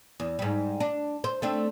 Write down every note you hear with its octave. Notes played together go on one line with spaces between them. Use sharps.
E2
G#2 G3
D4
C5
A3 C4 D4